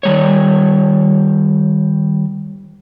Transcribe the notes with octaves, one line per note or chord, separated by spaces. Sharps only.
D#3 G3 C#5